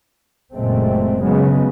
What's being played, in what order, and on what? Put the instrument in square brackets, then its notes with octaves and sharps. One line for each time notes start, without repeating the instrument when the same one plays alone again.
[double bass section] F#1 A#2 G#3 A3 C4
C#3 F#3 G#3 B3